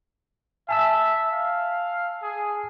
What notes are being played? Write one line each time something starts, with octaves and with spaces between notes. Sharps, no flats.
E5 G#5 A5 E6
F5
G#4